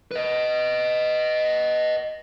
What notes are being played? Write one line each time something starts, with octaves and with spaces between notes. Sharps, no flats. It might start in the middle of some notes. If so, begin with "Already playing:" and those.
B4 D#5